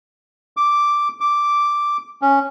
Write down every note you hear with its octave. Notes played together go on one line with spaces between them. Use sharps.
D6
D6
C#4